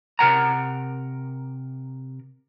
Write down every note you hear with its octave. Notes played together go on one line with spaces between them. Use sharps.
C3 A#4 F#5 A#5